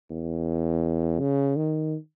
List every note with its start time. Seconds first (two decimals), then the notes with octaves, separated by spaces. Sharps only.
0.11 E2
1.20 C#3
1.57 D#3